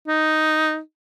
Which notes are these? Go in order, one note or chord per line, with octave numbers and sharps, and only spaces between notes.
D#4